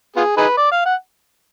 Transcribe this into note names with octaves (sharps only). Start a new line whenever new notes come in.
B3 F4 G#4
D#4 G#4 B4
D5
F5
F#5